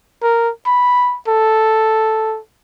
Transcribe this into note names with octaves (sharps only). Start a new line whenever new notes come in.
A#4
B5
A4